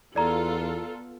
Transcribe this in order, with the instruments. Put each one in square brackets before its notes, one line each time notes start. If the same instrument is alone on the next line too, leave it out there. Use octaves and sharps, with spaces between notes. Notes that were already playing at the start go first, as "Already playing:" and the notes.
[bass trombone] E2 [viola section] B3 F4 A4 [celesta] D5 A#5